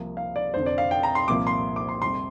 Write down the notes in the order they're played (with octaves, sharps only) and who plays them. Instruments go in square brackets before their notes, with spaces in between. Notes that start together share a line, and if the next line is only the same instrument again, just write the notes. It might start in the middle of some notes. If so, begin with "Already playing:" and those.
Already playing: [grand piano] C2 C3 F3 A#3
F5
D5
F1 F2 D3 C5
D5
F5
G5
A#5
C6
C2 A#2 F3 A#3 D6
C6
D6
C6
F1 F2 C3 G3 C6